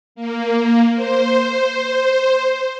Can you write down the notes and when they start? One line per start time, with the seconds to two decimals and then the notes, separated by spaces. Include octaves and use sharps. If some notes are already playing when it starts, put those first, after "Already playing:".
0.15 A#3
0.95 C5